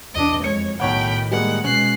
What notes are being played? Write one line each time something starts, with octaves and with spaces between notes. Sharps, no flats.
E2 D4 D#5
F2 G#3 C#5 C#7
B1 A2 D#3 C#5 F#5 G5 B5
G3 G#3 A#3 F#5
B2 G#3 C#4 F#6 C7